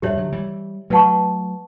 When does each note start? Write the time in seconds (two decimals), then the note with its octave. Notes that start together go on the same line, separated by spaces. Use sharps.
0.02 E2 G2 G4 C#5 E5
0.17 D3 F#3
0.32 E3 G3
0.90 F#3 A3 B4 F#5 A5 C#6